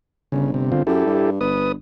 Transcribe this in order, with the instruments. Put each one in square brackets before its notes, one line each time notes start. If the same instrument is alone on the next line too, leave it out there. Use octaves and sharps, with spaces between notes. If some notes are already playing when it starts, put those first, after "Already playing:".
[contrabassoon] G1 [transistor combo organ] C#3
[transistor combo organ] C3
D3 C4 F4
[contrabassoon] F#2 [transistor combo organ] E4 G4 A4
[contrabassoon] G2
[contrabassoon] G1 [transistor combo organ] B4 D#6